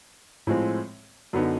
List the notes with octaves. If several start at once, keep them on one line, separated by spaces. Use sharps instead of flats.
A2 F3 G#3 C4
F#2 D3 F#3 B3 D#4